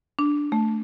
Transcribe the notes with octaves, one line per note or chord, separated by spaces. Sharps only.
D4
A3